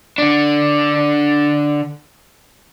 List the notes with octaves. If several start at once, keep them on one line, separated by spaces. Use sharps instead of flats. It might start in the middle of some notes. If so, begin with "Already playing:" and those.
D3 D4